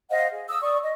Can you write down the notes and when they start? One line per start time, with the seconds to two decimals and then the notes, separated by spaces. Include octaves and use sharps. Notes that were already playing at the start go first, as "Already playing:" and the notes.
0.10 C5 D#5 F5 F#5
0.31 G#4
0.49 D#6 E6
0.61 D5 C#6 D#6
0.82 D#5